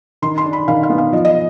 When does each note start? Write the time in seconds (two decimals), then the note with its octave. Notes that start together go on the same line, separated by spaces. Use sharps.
0.22 D#3 C6
0.38 C6
0.46 D4
0.53 B5
0.68 D#3 F5
0.83 F5
0.90 B3
0.98 F5
1.12 F3 D#5
1.25 D#5